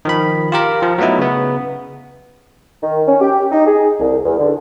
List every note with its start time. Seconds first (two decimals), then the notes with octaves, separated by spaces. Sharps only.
0.05 D#3 F3 B5
0.52 F4 G4 A#4
0.82 F3
0.98 F#3 A3 B3 D#4 E4
1.19 C#3 B3
2.83 D#3
3.07 C#4
3.21 G4
3.52 D#4
3.67 G#4
4.00 C2
4.25 E2
4.39 D3